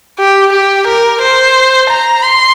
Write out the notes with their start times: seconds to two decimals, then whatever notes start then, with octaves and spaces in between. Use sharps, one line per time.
0.19 G4
0.52 G4
0.87 A#4
1.21 C5
1.90 A#5
2.24 C6